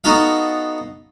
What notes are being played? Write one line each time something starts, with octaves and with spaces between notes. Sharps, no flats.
B3 D#4 F#4 A4 F5